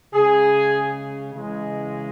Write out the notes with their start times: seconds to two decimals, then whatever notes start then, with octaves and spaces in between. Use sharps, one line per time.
0.13 C#3 G#3 G#4
1.34 C#3 E3 G#3